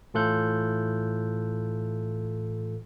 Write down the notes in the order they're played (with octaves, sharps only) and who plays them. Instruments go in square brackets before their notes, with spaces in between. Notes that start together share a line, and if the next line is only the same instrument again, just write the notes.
[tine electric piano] A2 E3 F4 A4 F#6 G6